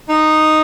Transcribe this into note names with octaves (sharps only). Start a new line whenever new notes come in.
D#4